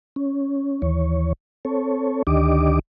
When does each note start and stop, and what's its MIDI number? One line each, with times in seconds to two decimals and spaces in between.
0.16 0.82 61
0.82 1.33 39
0.82 1.33 52
0.82 1.33 73
1.65 2.23 60
1.65 2.23 69
1.65 2.23 73
2.27 2.79 38
2.27 2.79 51
2.27 2.79 62
2.27 2.79 67
2.27 2.79 75
2.27 2.79 86